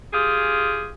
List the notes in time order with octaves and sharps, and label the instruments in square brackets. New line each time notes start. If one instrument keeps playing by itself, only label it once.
[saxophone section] F4 G4 G#4